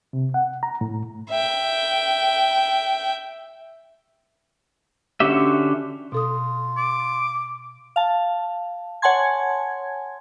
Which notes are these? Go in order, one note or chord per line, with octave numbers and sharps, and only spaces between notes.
C3
F#5
A#5
A2
E5 G5
D3 C#4 F#4 G4 E5
B2 F4 A4 D#6
D6
F5 A5
C#5 F#5 G#5 A5 C6 G#6